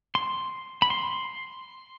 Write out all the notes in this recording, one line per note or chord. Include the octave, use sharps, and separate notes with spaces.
C6
B5
C6